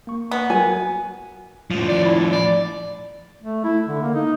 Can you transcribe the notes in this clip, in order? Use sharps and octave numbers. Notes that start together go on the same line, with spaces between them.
A#3 C#6
B3
F#3 F#4 A#4 G#5
A2 F3
D5
E4
D5
A3
E4
D3
A#3
D#4